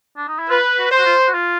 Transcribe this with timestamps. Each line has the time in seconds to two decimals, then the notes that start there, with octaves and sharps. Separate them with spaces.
0.17 D4
0.28 D#4
0.39 E4
0.50 F4 B4
0.78 F#4
0.92 C5
0.98 F#4
1.06 F4
1.27 F#4
1.34 F4